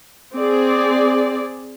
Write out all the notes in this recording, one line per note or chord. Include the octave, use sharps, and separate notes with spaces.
C4 G#4 D5